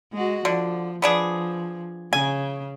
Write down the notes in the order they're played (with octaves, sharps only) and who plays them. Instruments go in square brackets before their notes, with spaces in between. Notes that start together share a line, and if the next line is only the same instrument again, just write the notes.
[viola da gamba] G#3 F#4
[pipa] D3 [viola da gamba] F3
[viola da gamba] F3 [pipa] B3 D4 G#4
[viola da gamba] C#3 [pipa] G#5